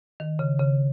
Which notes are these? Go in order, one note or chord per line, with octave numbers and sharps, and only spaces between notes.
D#3
C#3
C#3